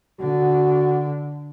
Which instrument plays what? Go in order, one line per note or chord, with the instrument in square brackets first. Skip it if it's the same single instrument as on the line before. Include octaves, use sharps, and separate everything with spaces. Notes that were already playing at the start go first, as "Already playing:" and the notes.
[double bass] D3 [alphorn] F#4